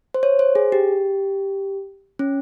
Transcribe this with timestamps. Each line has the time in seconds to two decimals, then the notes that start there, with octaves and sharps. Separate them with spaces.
0.14 C5
0.23 C#5
0.39 C5
0.55 G#4
0.72 G4
2.19 C#4